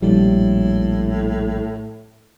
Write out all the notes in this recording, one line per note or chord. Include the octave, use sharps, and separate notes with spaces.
A#1 A2 G3